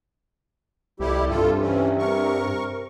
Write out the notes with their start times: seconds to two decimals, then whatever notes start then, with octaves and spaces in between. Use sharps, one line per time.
1.00 C2 F2 G3 E4 G4
1.30 G2 C3 F4 A4
1.61 E3 C4 C#4
1.99 A#4 C#6